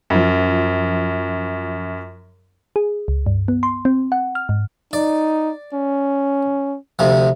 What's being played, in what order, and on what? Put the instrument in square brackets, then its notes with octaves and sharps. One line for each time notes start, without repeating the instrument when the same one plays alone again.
[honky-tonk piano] F#2 F3
[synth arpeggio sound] G#4
C#2
G2
B3
C6
C4
F#5
F6
G#2
[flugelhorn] D#4 [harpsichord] D5
[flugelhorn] C#4
[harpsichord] D2 C3 F3